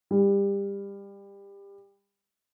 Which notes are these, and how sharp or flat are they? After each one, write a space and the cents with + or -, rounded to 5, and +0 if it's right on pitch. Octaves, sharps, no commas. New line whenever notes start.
G3 +25